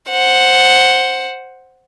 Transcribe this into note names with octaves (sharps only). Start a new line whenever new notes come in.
C5 F#5